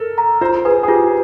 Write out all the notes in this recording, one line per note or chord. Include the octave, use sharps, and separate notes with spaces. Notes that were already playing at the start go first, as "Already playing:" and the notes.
Already playing: A4 A#4
A#5
F4 C5
G#4 B4
G#4
F4 G4